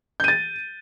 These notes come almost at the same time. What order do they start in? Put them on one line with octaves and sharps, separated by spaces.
G6 D#7 A6